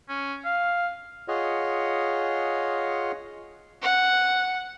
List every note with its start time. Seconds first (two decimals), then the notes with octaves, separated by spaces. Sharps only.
0.09 C#4
0.45 F5
1.28 F4 G#4 C#5 D#5 F#5
3.82 F#5